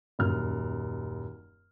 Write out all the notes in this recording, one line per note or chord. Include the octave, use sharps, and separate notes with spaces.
D#1 F#2 F6